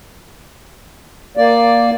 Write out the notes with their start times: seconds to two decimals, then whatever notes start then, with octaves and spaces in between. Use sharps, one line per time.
1.37 A#3 D5